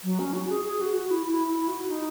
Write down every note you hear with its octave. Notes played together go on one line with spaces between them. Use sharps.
F#3
C#4
F#4
G#4
G#4
F#4
F#4
E4
E4
E4
F#4
D#4